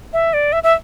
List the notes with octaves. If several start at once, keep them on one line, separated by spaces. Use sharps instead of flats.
E5
D5
E5
E5